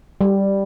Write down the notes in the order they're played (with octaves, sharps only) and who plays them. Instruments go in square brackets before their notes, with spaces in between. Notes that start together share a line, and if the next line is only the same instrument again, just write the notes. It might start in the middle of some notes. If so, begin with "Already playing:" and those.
[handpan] G3